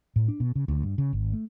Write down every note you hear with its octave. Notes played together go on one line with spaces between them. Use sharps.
A2
D4
B2
C#3
D2
G2
C#3
G#1
A3